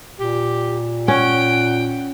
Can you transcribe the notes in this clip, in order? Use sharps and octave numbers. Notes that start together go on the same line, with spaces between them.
A#2 G4
C#4 F#5 G5